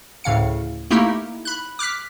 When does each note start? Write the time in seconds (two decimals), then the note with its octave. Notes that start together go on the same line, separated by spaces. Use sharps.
0.24 D2 A2 C#3 F5 C#7
0.91 A3 A#3 D#4 E4 G4
1.45 B5 F#6
1.79 D6 F6 F#6 B6